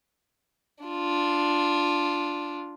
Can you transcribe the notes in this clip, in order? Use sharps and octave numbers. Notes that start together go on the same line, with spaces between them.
D4 F4